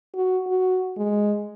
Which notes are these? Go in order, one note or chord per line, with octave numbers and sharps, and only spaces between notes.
F#4
F#4
G#3